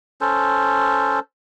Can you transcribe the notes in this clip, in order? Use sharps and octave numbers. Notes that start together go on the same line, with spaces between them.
C#4 A4 C5